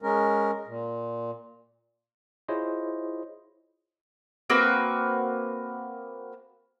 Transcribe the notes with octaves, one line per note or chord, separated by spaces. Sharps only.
G#3 C#4 A#4
A#2
E4 F4 G#4 C5 C#5 D#5
A#3 C4 F#4 B4